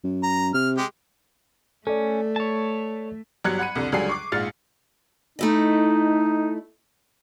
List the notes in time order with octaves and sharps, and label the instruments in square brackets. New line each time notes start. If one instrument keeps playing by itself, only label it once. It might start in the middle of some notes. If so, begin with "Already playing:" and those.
[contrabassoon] F#2
[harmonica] A#5
[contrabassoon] C3 [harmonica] F6
[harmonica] G#3 G4
[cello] A3 [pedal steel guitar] C#4 [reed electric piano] A4 D5
[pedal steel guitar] C#5 A5
[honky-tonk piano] G1 F#3 G3 F#6 G#6 C#7
F#5 B5 C#7 D#7
C2 F2 D3
C#2 D3 F#3 G3 G#5 C7
C#6 D6 C7
A#1 G#2 F4 F6 A6 C#7
[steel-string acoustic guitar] A3 E4 D#5 [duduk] D#4